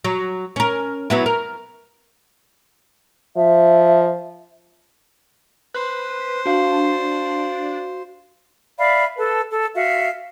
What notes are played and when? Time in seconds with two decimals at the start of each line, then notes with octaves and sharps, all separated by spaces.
0.04 F#3
0.56 C#4 A#4
1.10 F#3 B3 E4
1.26 A#4
3.37 F3 E5
5.74 B4 C5
6.46 D4 F#4 F5
8.78 D5 E5 F5 B5
9.17 A4 B4 A5
9.50 A4
9.75 F#4 E5 F5